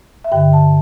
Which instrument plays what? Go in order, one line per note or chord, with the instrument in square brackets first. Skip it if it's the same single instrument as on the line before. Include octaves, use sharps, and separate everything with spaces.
[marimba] E5
G2 D3 G5
A5